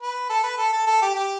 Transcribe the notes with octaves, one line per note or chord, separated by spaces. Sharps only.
B4
A4
B4
A4
A4
A4
G4
G4